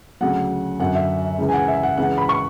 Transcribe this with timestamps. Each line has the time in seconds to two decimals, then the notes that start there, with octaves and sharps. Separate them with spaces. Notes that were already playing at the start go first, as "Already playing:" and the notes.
0.21 D2 C#3 F#3 F#5
0.79 F#2 D3 F#3 F#5
0.95 E5
1.38 C#2 C#3 E3
1.49 G#5
1.53 F#5
1.68 E5
1.83 F#5
1.97 C#2 C#3 E3 F#5
2.18 B5
2.29 C#6